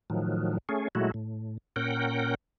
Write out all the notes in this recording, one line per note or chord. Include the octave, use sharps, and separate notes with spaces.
A2 D#3 F3 F#3
A3 C#4 G#4
A#2 F#3 G#3 A3 E4 F#4
A2
A#2 C#4 A#4 F#5 G5